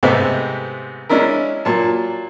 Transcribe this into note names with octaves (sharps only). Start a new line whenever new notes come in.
G#2 C3 G#3 A3 B3 C4
G#3 C#4 D4 E4 A#4
A#2 F#3 A5